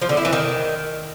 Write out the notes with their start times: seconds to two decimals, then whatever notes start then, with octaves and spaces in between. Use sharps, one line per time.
0.01 F3
0.09 D3
0.17 E4
0.25 E3
0.33 D#3